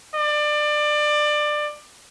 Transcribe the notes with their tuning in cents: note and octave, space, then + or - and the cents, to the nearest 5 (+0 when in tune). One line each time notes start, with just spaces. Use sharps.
D5 +25